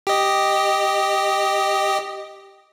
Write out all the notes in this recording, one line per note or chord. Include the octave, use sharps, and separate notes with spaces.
G4 D#5